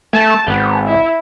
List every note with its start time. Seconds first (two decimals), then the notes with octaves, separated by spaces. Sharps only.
0.13 A3 A5
0.47 G#1 B3
0.87 E4